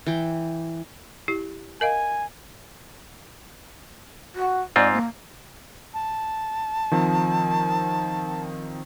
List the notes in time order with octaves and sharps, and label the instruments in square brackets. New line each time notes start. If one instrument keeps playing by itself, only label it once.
[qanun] E3 G5
[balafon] E4 G4
[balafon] A#4 D#5 F5 [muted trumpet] G#5
[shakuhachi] F#4
[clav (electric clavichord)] G#2 C4 F4 [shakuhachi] D5
[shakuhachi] A#3
[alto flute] A5
[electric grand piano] D#3 F3 C4